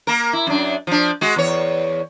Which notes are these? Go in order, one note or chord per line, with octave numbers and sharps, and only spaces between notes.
A#3 A#4
E4
F#2 D4
F3 D4
G#3 F#4
E2 C#5